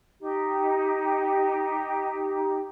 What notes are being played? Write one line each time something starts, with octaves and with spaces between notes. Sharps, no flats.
D#4 G4